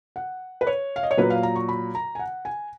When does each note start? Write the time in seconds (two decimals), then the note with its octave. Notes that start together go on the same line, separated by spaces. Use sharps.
0.16 F#5
0.61 B4
0.67 C#5
0.96 F5
1.03 D#5
1.11 C#5
1.17 A#2 F#3 B4
1.30 F5
1.43 A#5
1.55 C#6
1.69 B5
1.95 A#5
2.15 G#5
2.19 F#5
2.45 G#5